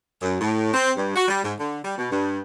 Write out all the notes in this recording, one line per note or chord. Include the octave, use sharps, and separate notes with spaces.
F#2
A2
C4
G2
F#4
G3
G#2
D3
G3
B2
G2